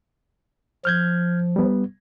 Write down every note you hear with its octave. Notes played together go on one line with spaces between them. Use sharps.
F3 F6 G6 G#6
G3 B3